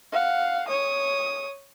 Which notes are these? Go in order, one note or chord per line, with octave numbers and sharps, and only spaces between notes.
F5 F#5
C#5 D#6